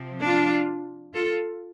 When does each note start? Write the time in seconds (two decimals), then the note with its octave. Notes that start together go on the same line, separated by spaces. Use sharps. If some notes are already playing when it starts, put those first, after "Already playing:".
Already playing: C3 F3 C4
0.23 D4 F4
1.14 F4 A4